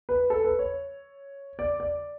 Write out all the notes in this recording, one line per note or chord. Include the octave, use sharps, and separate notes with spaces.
B4
A4
B4
C#5
D5
D5